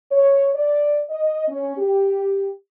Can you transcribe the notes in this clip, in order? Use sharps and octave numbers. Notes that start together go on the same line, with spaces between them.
C#5
D5
D#5
C#4
G4